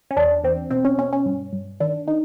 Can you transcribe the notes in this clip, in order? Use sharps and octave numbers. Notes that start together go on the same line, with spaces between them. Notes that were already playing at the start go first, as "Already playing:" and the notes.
C#4
E2 D4
E2 C4
B2 C4
C#4
B2 C#4
C#4
G2
G2
D#3 D4
D#3 D#4